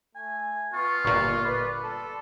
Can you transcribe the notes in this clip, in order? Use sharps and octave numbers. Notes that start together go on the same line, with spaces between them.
A3 G#5
B3 F4 C#6
G1 A#2 C#6
B4 D5
A4